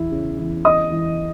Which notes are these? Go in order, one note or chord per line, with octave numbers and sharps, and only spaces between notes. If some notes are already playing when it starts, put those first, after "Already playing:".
Already playing: E2 E3 E4
C#3
E3
E3 D#5 D#6
E3